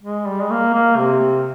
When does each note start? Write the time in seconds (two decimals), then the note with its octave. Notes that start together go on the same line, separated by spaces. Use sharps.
0.03 G#3
0.27 G3
0.42 G#3
0.50 A#3
0.74 A#3
0.98 C3